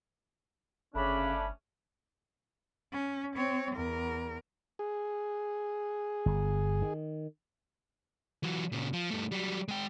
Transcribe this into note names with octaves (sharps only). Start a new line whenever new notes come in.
G1 C#3 A3 C#4 D4 B5
C#4
C4 C#5
E2 A#4
G#4
G1
D#3
E3 F#3
A#2 C#3
F3
G2 A3
F#3 G3
G#3 G5